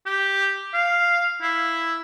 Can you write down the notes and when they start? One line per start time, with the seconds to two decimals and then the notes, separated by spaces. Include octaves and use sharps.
0.06 G4
0.74 F5
1.41 E4